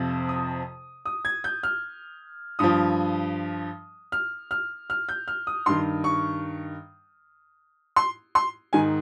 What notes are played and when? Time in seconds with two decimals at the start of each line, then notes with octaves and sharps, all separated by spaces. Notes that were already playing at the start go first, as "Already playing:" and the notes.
Already playing: F2 C3 F3
0.29 D#6
1.06 D#6
1.25 G#6
1.44 G6
1.63 F6
2.59 G2 F3 D#6
4.12 F6
4.51 F6
4.90 F6
5.09 G6
5.28 F6
5.47 D#6
5.66 G2 D#3 C6
6.04 C#6
7.96 C6
8.35 C6
8.73 G#2 D#3 G#5